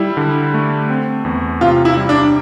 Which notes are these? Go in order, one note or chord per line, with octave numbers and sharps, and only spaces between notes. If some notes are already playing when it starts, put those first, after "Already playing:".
Already playing: G3 E4
D3
A3
C4
E2
C3 F4
E4
G3
D4